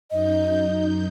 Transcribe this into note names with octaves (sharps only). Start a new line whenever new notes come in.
F#2 D#4 D#5 G6